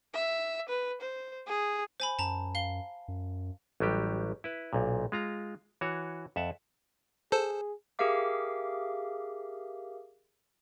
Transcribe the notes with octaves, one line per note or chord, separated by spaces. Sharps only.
E5
B4
C5
G#4
C5 G#5 B5
F#2 A5 A#5
F5 G7
F#2
A1 F#3 G3 G4
E4 B4
B1 A#2
G#3 F4 A#5
E3 F#4 C#5
F2 E5 F#5 A5
G#4 A4 C5 A5
G4 G#4 A#4 E5 F5 D6